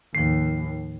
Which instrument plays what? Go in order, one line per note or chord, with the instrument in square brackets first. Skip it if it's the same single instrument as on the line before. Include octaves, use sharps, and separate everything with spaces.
[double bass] D#2 [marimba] A2 D#3 F3 [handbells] C7